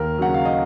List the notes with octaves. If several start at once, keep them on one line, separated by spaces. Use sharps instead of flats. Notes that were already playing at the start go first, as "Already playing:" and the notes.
Already playing: D#2 A#4
C#3 F#3 F#5
F5
D#5